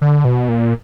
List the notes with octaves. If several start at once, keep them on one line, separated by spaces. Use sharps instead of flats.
D3
B2
A#2